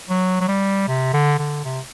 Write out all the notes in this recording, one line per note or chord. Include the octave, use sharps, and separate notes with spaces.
F#3
F#3
G3
C3
D3
D3
C3